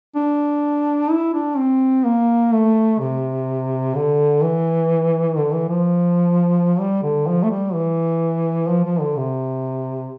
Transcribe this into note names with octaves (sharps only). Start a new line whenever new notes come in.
D4
E4
D4
C4
A#3
A3
C3
D3
E3
D3
E3
F3
G3
D3
F3
A3
G3
E3
F3
F3
D3
C3